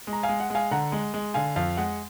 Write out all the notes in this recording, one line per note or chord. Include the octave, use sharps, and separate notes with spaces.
G#3
A#5
F5 G#5
G#3
F#5
G#3 F5 G#5
D3 F#5 A#5
G#3
G#3
D3 F5 G#5
F2 F5
G#3 F#5